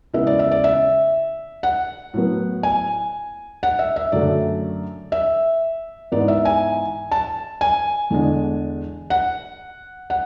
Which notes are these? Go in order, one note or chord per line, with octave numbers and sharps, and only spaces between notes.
C#3 G#3 B3 E4 E5
D5
E5
D5
E5
F#5
A2 F#3 B3
G#5
F#5
E5
E5
F#2 D3 F#3 A3 D5
E5
G#2 E3 B3 D5
E5
G#5
A5
G#5
E2 D3 G#3 D4
F#5
F#5